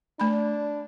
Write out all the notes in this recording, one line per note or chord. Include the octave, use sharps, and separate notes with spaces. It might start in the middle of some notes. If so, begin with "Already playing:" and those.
A3 D4 B5